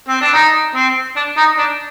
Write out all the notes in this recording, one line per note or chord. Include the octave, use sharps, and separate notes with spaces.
C4
D4
D#4
C4
D4
D#4
D4